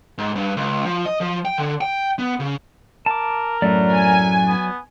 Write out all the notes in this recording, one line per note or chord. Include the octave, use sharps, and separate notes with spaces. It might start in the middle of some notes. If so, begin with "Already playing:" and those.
G#2
G2
C#2
F3
D#5
F3
G5
D3
G5
B3
C#3
A#4 A5 D6
F#2 A2 F#3 A3 D5
G#5
B3